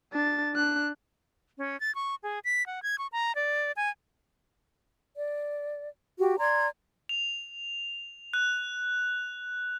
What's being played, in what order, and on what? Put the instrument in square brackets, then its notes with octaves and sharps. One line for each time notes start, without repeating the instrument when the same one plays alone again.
[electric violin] D4 A6
D4 F#6
[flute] C#4
A6
C#6
G#4
B6
F#5
G#6
C#6
A#5
D5
G#5
[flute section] D5
F#4 G4
D5 A#5 C6 G#6
[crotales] F7
F#6